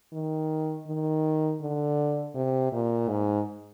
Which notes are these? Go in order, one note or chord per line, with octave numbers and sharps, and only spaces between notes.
D#3
D#3
D3
C3
A#2
G#2